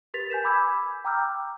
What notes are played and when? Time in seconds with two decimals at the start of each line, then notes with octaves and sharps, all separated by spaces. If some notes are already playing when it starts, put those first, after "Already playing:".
0.14 G4 A#4 B4 A6 B6 F7
0.30 G#5 G6 B6 E7
0.44 G#5 B5 D6 E6 G6 G#6
1.04 G5 A#5 D6 E6 F6 G6